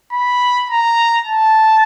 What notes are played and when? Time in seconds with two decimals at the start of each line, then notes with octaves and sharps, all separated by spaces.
0.13 B5
0.70 A#5
1.26 A5